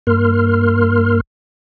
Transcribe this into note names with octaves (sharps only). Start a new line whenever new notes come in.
G2 A#3 A#4 C6 F6